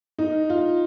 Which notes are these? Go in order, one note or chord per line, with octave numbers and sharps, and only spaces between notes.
D#4
F4